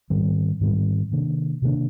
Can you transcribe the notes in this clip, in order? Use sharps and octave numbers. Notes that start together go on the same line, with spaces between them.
G#2 D#3 G3 C4
G#2 D#3 G3 C4
C3 D#3 A#3 D4
C3 D#3 A#3 D4